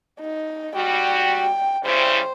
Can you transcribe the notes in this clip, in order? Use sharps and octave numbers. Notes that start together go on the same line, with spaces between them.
D#4
G3 F#4 G5
C#3 G3 E4 C5